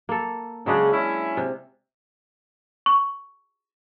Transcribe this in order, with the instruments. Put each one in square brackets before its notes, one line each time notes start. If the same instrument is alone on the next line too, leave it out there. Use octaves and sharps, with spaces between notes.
[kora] A#3 A4
[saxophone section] C#3 [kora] F#3 G#3 D4
[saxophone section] C#4 E4
[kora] C3
[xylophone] C#6